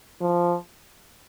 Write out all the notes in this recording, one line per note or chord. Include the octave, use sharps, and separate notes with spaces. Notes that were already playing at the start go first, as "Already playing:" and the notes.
F3